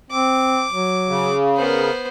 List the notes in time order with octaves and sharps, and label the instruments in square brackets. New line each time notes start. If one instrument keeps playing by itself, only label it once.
[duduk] C4 [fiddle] D6
[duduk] F#3
[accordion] C#3
[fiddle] B3 C5 [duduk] A#4